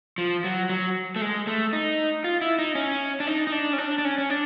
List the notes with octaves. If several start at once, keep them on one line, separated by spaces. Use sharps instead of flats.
F3
F#3
F#3
A3
G#3
A3
D#4
F4
E4
D#4
C#4
D4
D#4
D#4
D4
C#4
D4
D4
C#4
C#4
D4